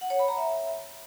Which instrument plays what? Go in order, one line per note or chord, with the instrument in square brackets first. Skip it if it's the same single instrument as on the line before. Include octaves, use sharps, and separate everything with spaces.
[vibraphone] F#5
C#5
B5
A#5
E5